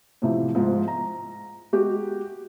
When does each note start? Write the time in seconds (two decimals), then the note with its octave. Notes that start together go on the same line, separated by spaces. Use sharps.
0.22 A2 C3 E3 F3
0.55 G#2 F3
0.88 A#5
1.73 G#3 F#4 G4